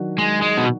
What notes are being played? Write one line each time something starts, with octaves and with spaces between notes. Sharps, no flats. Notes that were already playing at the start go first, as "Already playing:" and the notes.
Already playing: D#3 F#3 D4 F#4
G#3
G#3
B2